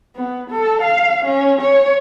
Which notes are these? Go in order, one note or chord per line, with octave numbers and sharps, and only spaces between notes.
B3
A4
F5
C#4
C#5